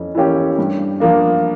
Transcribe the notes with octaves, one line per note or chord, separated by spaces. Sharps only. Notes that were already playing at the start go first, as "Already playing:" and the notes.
Already playing: F2 E3 C#4
E3 A#3 C#4 G4
G2
F3 A#3 D4